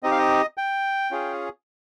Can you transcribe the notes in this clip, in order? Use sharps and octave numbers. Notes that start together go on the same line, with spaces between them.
C4 D#4 G4 D#5
F5
D#5
G5
C#4 F4 G#4